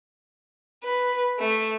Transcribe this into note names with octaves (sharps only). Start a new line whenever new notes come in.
B4
A3